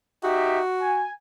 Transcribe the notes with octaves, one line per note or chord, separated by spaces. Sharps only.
D#4 F#4 G4 E5
G#5